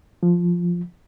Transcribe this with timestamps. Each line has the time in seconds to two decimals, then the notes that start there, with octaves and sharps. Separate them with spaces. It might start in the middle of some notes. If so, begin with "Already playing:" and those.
0.23 F3